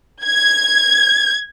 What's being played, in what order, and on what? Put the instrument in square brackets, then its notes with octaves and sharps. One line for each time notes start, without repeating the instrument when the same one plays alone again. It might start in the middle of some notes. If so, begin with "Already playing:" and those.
[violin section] G#6